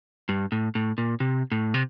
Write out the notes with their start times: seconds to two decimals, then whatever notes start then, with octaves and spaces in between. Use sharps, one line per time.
0.29 G2
0.52 A2
0.75 A2
0.98 A#2
1.20 C3
1.52 A2
1.74 C3